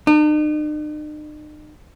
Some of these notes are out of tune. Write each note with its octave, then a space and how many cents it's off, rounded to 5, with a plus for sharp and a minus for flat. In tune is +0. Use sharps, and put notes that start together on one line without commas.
D#4 -45